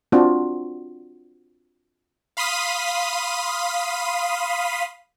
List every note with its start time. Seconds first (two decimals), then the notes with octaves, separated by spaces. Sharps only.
0.12 C4 D4 F4 F#4
2.37 F5 B5 C6 D#6 B6 D#7